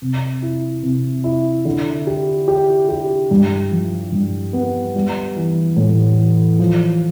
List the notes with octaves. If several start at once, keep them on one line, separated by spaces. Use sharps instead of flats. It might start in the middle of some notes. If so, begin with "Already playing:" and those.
C3
E4
C3
E4
D3
G4
G4
G4
G2
F3
G2
B3
G3
E3
A2
E3
F3